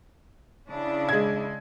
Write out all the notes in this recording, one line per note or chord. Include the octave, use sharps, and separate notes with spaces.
C#3 D4 E4
G#3 G#6